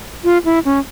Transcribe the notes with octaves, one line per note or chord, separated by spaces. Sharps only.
F4
E4
C#4